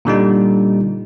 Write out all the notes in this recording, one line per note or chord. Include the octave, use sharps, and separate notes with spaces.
A#2 D3 G3 D#4